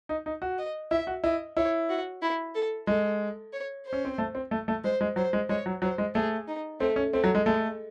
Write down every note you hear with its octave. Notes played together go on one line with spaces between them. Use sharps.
D#4
D#4
F#4
D#5
E4 E5
F#4
E4 D#5
E4 C#5
F#4
E4
A4
G#3 A4
C#5
C5
C#4
C4
A3
C4
A3
A3
G#3 C5
G#3
F#3 C5
G#3
G#3 C#5
F#3
F#3 C5
G#3
A3 G#4
D#4
A3 C4
C#4
A3 C4
F#3
G#3
G#3 A3